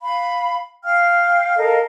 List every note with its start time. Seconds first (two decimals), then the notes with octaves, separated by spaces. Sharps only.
0.01 F5 B5
0.84 F5 G5 F6
1.57 A4 A#4 D#5 F5